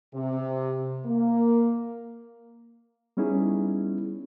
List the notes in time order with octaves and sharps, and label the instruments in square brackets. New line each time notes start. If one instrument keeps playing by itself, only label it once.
[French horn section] C3
A#3
[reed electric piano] G3 B3 C#4 D#4 E4 G#4